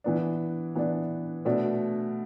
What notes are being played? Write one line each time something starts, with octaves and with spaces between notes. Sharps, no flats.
E3 B3 D4
E3 B3 D4
B2 A3 D4